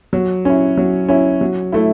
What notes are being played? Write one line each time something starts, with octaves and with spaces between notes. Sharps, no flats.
F#3
C#4 E4
F#3
C#4 E4
F#3
A3 E4